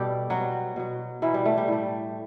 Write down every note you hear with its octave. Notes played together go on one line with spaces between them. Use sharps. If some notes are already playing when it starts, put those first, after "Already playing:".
Already playing: B2 G3 G4 A4
B2 F#3 G3 F#4
B2 F#3
B2 E3 F#3 E4
G3
A3
G3
A2 G3